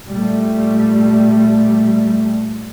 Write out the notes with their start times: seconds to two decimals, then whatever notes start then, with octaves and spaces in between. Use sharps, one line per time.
0.10 A#2 G3 A3